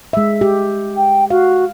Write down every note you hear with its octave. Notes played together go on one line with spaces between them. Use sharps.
G#3 E5
G4
G5
F#4 F5